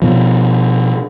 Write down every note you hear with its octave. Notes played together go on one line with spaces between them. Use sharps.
B2 F3